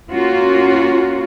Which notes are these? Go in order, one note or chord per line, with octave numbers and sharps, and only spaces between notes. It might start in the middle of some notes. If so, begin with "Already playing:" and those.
A#3 C#4 F4 F#4